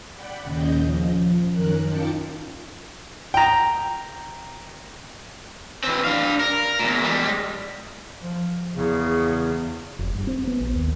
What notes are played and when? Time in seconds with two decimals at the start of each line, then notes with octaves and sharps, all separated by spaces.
0.13 D5 F#5 G5 B5
0.42 D#2 A#2 C#3 C#4 D#5 G6
0.83 F3
1.51 F#2 D#3 C#4 A#4 F#6
1.83 D#4 F4 G5 A5 D6 C#7
3.34 G5 A#5
5.84 E3 C4
6.05 D4 F5
6.40 A#4
6.79 E2 A#2
7.03 G3 G#3
8.22 F3
8.76 E2 C#3
9.99 F1
10.15 G2
10.27 C4
10.47 B3
10.60 A#1
10.75 D#2